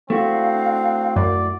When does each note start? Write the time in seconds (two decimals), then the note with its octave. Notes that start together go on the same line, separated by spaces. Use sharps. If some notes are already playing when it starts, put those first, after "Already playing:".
0.10 A3 C4 D4 E4 F#4 F5
1.16 F#2 D5